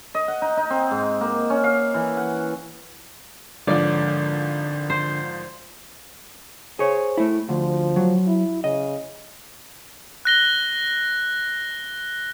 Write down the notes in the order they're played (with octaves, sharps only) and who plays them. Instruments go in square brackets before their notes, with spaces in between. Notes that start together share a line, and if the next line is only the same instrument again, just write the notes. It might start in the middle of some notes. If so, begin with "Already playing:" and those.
[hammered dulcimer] D#5
F#5
D#4
D#4
C4
G#2
A#3
C#4
F5
E3
F#5
[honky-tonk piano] G#1 F3 [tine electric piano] D3 [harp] D5
[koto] C5
[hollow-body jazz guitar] G#4 C#5 [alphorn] C5
[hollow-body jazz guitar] A3 E4
[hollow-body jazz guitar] D2 [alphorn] F3
[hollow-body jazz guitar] F#3
[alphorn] E4
[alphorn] C#3 [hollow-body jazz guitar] D#5
[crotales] F#6 A#6 G7